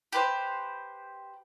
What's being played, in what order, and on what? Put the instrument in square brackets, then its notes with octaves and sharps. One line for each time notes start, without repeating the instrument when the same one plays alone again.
[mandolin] G4 B4 C5